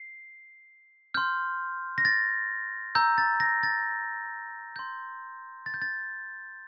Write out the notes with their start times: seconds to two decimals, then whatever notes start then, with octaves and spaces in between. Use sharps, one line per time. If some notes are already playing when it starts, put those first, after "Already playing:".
Already playing: C7
1.14 C6 F6 G6
1.98 A#6
2.05 A6
2.95 A#5 E6 G6
3.18 A6
3.40 A#6
3.63 A6
4.76 C6 G6
5.66 A6
5.74 G6
5.82 A6